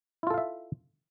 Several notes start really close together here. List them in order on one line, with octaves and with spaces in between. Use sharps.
E4 F4 A4 F5 E5